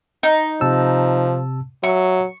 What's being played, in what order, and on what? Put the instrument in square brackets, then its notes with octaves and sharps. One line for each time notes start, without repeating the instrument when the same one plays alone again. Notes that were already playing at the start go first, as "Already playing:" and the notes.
[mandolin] D#4
[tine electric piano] C3 A5 E6 [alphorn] F3
[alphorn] F#3 [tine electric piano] E5 [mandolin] C#6